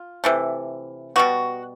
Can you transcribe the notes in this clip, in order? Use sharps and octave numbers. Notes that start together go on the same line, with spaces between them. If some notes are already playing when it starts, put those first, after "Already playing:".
Already playing: F4
C3 E3 A3
B2 G3 B3 F#4